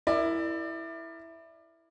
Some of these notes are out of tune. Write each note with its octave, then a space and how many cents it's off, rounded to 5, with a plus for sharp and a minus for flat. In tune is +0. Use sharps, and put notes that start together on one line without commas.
E4 +0 A#4 +0 D5 +25